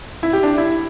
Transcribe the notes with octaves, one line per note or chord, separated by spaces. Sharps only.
E4
G4
D4
E4